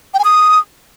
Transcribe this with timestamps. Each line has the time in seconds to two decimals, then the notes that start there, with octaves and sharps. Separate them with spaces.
0.14 G5
0.19 G#5
0.24 D#6